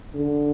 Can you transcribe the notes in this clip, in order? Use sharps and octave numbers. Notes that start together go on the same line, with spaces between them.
D3